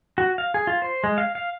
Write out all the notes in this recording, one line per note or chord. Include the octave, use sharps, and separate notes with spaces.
F#4
F5
G#4
F4
C5
G#3
F5
F5